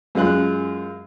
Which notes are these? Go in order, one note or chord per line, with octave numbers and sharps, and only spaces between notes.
F#2 G#3 F4 F#6